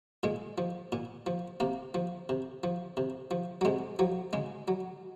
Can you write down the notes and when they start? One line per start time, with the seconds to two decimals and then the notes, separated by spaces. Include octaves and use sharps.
0.23 A#2 G#3
0.58 F3
0.92 A#2
1.26 F3
1.60 C3 A#3
1.94 F3
2.29 C3
2.63 F3
2.97 C3
3.31 F3
3.61 F#3
3.65 C3 G#3
3.99 F3 F#3
4.33 C#3 G#3
4.68 F#3